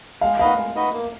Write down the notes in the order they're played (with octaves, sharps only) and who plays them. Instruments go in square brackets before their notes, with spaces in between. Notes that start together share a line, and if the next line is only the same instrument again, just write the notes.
[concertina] G#3 [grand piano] F5
[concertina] D#4 F#4 B4 D#5 [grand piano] F5
[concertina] G#3
D#4 F#4 B4 D#5
A#3